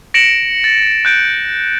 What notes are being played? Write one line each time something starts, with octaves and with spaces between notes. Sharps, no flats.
A#6 C#7 D7 E7 F#7
A6
F#6 G6 D7